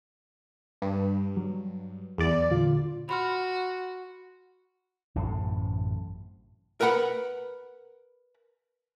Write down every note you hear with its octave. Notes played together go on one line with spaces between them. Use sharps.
G2
F#3
E2 D5
A#2 D3 F4
F#4 B5 C6 F6
A1 F#2 A2 C3
A#4 B4 F#5 B5